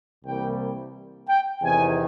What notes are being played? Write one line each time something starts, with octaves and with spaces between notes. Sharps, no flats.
C2 C3 E3 G3 A#3 G5
G5
E2 C3 D#3 G#5